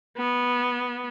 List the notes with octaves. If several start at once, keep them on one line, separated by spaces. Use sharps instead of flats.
B3